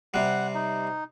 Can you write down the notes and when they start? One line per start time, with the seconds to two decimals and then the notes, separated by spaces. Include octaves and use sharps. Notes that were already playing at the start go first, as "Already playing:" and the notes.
0.14 C3 G3 F#5
0.55 D#4